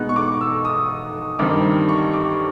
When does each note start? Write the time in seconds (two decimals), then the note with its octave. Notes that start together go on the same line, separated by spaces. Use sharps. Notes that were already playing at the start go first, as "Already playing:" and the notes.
Already playing: B2 G#3 B3 D#4 F#6
0.09 C#6
0.16 D6
0.41 E6
0.65 D#6
1.39 G2 D#3 G3 C4 D#4 D6
1.89 C#6
2.13 D6